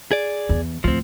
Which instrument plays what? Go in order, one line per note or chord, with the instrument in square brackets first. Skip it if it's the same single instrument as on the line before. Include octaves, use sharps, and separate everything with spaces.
[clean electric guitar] G#4 D5
[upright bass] E2
[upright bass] D2 A2 [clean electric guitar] F3 C4